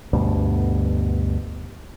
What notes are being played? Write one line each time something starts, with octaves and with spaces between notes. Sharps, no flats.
D2 G2 B2